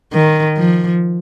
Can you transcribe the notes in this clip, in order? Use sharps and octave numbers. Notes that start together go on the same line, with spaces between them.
D#3
F3